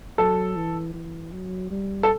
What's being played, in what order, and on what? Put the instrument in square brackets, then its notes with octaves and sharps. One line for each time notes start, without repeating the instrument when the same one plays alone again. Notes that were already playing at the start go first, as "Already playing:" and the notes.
[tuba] F#3 [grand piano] A4
[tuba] E3
E3
F#3
G3
[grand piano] A4